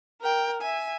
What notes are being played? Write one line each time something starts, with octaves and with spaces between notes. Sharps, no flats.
A#4 G5
E5 G#5